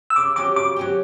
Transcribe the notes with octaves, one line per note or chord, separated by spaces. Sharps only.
E6
C#3 D6
F#3 C#4 G4 D6
C#3 D6
F#3 C#4 G4